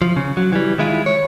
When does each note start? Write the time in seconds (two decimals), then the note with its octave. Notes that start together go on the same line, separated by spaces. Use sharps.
0.02 F3
0.16 C#3
0.37 F#3
0.53 E3 G3
0.78 D#3 G#3 E4 F4
1.06 C#5